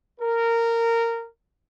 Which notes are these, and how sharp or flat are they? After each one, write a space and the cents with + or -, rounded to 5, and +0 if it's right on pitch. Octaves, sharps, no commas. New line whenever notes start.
A#4 -15